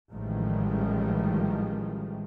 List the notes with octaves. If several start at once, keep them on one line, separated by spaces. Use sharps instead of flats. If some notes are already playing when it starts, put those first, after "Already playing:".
A1 A2 D#3 F3 G3 G#3